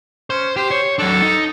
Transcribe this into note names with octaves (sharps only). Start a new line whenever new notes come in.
C#4 C5
G4 C5
C#5
F#3 D4 A4
D#4